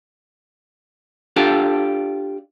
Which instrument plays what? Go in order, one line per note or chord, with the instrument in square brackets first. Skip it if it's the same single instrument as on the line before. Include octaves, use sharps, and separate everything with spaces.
[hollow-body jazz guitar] D4 F4 G4 A4